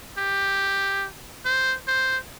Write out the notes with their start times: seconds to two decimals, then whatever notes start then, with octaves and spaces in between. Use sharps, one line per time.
0.18 G4
1.45 C5
1.88 C5